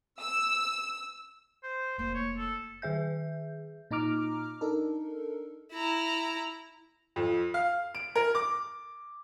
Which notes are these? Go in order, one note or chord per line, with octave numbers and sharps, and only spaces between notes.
E6
C5
F1 A#3 C5
C#5
A4
D#3 G#4 E5 G6
A#2 D#4 A#5 D6 F6
D4 D#4 A4 A#4
E4 A#5
F2
F5
D7
A#4
D6